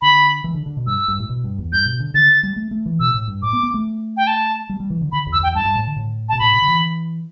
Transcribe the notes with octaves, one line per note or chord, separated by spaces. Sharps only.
D3 B5
E3
D3
D3
B2
G2 E6
G2
A2
B2
G2
E2
G2 G6
B2
D3
D3 A6
G3
A3
A3
E3
B2 E6
A2
G2
A2 D6
B3
B3
A3
G5
A5
G3
G3
E3
D3
D3 B5
E2
E6
E2 G5
G2 A5
G2
A2
D3
A2
B2 A5
A2 B5
B2
D3
E3